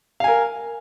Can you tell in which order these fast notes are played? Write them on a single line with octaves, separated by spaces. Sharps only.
F5 G#5 A#4